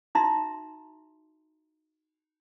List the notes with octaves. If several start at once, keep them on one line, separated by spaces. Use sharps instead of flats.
D#4 E4 F#4 E5 A#5 C6